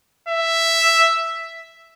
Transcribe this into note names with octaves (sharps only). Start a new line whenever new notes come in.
E5